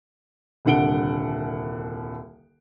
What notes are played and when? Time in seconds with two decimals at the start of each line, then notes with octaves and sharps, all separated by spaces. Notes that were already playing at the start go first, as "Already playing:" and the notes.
0.65 D#1 C2 D3 F#5 D7 G7